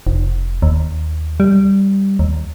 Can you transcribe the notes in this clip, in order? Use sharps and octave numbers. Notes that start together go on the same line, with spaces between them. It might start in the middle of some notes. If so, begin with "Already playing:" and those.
F1
D#2
G3
D#2